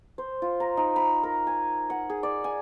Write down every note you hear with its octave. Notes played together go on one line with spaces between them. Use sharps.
C5
F4
A#5
D#4
B5
A#4
G#5
F#5
G#4
D5
G#5